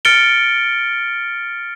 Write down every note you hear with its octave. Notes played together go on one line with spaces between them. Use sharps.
F6 A6 C#7 D7 G7